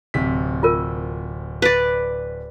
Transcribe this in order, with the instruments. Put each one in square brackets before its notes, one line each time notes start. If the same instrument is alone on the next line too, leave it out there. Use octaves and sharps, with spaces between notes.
[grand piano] D1 C3 B6
[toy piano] F4 A#4
[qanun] B4 D5